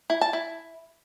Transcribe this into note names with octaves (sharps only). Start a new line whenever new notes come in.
E4
A5
E4